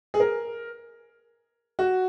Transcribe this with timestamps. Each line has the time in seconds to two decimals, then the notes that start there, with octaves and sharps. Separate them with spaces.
0.14 G#4
0.20 A#4
1.79 F#4